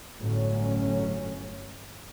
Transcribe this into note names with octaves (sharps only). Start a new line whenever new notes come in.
G1 A2 F#3 C#4